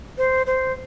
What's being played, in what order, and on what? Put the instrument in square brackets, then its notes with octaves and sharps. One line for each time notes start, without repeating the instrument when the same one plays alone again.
[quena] C5
C5